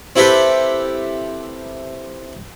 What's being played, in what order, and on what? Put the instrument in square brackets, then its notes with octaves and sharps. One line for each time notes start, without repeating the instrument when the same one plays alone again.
[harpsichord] C4 E4 G4 A4 B4